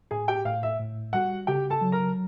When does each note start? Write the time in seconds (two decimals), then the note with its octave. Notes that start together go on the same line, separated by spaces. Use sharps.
0.11 A2 G#4 G#5
0.28 G4 G5
0.45 A2 F5
0.63 E5
0.79 A2
1.13 G3 F#4 F#5
1.47 C#3 G4 G5
1.70 A4 A5
1.81 F#3
1.92 A#4 A#5